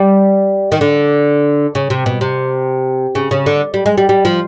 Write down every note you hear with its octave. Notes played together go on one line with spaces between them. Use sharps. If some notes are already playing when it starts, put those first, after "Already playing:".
Already playing: G3
D#3
D3
C#3
C3
B2
C3
C#3
C#3
D3
G3
G#3
G3
G3
F3